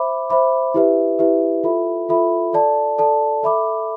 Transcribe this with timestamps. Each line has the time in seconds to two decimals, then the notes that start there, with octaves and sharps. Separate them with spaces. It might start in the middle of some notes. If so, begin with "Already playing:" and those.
Already playing: C5 E5 B5 D6
0.30 C5 E5 B5 D6
0.74 E4 G4 B4 E5
1.19 E4 G4 B4 E5
1.64 F4 A4 E5 B5
2.09 F4 A4 E5 B5
2.53 A4 D5 A5
2.98 A4 D5 A5
3.43 A4 E5 B5 D6